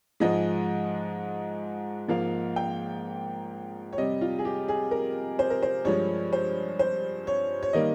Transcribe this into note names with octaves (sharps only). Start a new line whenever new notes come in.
G#2 F3 G#3 D#5
G#2 F3 A#3 F5
G5
C#5
F2 C3 G3 D#5
F4
G#4
G4
G#4
A#4
C5
A#4
C5
G2 F3 G#3 C#5
C5
C5
C#5
C#5
D#3 G3 A#3 D#5